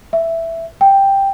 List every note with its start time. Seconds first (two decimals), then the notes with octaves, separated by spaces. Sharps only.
0.13 E5
0.81 G5